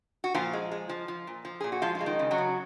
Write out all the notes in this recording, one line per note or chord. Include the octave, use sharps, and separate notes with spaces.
F#4
A#2 F3 F4
G#3
G#3
F3
F3
A#2
F3
A#2 G#4
F#4
F3 G#3 F4
F4
G#3
D#3 D#4
C#3
F#3 F#4
C#3